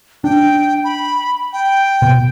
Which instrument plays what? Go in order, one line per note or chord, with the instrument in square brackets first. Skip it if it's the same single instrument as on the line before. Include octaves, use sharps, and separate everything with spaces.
[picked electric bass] D4 [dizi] G5
[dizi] B5
G5
[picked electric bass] B2